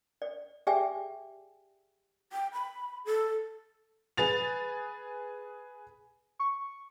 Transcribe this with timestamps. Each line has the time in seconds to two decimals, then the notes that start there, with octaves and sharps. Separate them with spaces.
0.22 D5
0.67 G4 G#4 D5 E5 G5 G#5
2.32 G5
2.53 B5
3.05 A4
4.17 G#4 B4 A6 F7
6.39 C#6